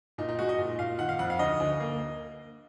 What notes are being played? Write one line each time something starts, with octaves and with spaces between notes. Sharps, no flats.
A#2 D#4
D#4
G#3 F#4
D#5
A#2
A#2 F5
D#3 F#5
F5
F2 F#5
F5
D2 D#5
D2
A#3